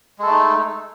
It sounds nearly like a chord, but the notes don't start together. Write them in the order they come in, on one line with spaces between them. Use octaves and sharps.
G#3 A4 A3 D#4